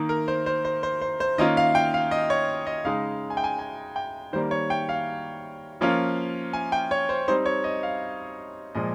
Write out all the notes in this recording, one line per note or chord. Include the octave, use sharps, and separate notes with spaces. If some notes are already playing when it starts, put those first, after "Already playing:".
Already playing: D#3 A#3 D#4
A#4
C5
C5
C5
C5
C5
C5
D#3 A#3 C#4 F4 D#5
F5
G5
F5
D#5
C#5
D#5
C#3 G#3 D#4 F5
G#5
G5
G#5
G#5
G5
D#3 G3 A#3 C5
C#5
G5
F5
F3 A#3 C#4 F4
G#5
G5
C#5
C5
G3 C4 D#4 C5
C#5
D#5
F5
A#2 F3 G#3 D#5